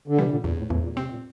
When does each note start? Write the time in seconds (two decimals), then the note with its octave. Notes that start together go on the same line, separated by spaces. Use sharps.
0.08 D3
0.17 C3 E3 G3
0.31 A#2 D3
0.44 E2 A#2
0.58 A2
0.70 E2 A2
0.83 A#2
0.96 C3 C4
1.10 A#2